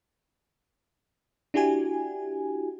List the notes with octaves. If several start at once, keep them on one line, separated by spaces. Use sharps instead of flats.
D4 E4 F#4 G4 G#5